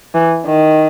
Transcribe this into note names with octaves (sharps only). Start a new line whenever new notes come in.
E3
D#3